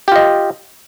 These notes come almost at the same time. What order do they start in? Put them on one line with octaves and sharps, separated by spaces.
G4 F4 D#5